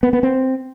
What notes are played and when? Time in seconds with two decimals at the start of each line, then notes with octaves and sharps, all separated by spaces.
0.03 B3
0.13 B3
0.23 C4